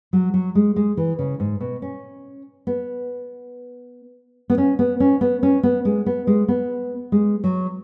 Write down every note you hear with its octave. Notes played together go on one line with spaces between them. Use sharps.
F#3
F#3
G#3
G#3
E3
C#3
G#2
B2
C#4
B3
B3
C#4
B3
C#4
B3
C#4
B3
G#3
B3
G#3
B3
G#3
F#3